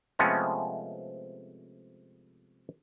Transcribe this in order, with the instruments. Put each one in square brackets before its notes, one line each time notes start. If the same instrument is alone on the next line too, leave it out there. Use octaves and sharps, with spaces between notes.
[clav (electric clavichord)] C3 F3 G#3 A3 B3 C#4